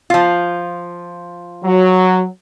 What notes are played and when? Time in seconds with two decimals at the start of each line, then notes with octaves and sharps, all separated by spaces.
0.10 F3 F4
1.64 F#3